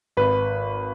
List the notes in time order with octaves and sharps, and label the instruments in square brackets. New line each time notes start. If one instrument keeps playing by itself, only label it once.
[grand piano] G#1 B4